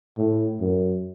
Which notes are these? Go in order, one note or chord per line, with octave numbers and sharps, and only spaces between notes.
A2
F#2